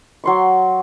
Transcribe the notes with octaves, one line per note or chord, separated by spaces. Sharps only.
F#3 C6 C#6